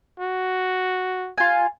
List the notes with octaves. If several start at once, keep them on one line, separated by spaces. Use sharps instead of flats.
F#4
F4 G#5